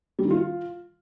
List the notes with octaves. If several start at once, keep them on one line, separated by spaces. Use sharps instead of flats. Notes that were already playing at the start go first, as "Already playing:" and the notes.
G3
D#3
F4